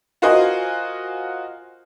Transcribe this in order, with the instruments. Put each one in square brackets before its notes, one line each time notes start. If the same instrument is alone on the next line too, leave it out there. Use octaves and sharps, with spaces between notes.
[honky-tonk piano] F4 F#4 A#4 C5 D#5 G#5